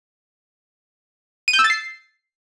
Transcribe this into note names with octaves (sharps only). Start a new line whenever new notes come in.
D#7
G6
E6
A6
C7